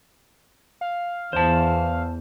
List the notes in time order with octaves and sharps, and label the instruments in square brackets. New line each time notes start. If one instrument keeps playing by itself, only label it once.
[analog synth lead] F5
[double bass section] E2 [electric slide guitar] C5 A5